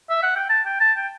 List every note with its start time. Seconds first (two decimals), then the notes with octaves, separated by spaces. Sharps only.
0.10 E5
0.23 F#5
0.36 G5
0.50 A5
0.66 G5
0.80 A5
0.96 G5